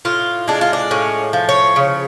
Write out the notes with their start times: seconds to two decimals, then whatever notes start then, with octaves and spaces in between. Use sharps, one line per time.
0.05 A2 F4
0.48 G#3 D4
0.61 F4
0.73 D4
0.91 A2 C#4
1.33 F3
1.49 C#5
1.76 C#3